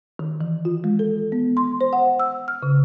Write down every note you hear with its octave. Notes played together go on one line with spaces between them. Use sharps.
D#3
E3
F4
G#3
A4
B3
C6
C5
F#5
E6
F6
C#3